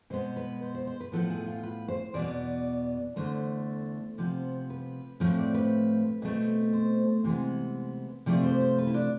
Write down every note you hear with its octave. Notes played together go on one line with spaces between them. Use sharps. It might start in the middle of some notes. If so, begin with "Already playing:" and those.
B2 G#3 B3 C5
B4
C5
C5
C5
B4
A2 F3 B3 A4
G#4
F4
B4
C5
E2 B2 B3 D5
E2 D3 A3 C5
C3 F3 B3
B4
A2 F3 A3 C4
D5
B4
B2 A3 C4
C5
C3 E3 G#3 B3
C3 F3 A3 D5
C5
C5
B4
E4
D4